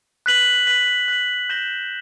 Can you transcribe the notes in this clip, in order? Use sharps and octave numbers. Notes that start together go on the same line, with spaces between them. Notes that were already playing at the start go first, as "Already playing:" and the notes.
F#6 B6 F#7
F#6 B6 F#7
F#6 B6 F#7
G6 A#6 E7 G7